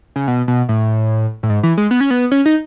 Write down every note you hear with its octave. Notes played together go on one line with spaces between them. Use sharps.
C#3
B2
B2
A2
A2
G#2
E3
G#3
B3
C#4
B3
C#4
D#4